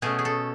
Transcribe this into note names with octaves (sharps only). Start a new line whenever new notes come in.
B2 A3 C#4 G#4
G#4
A4